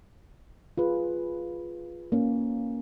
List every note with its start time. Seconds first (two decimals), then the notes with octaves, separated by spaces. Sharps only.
0.78 F4 G#4 B4
2.12 A#3 C#4